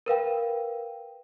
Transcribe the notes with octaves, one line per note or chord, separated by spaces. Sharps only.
A#4 B4 F5 G5